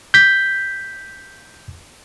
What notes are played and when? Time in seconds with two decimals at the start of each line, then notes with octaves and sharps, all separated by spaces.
0.14 G6 B6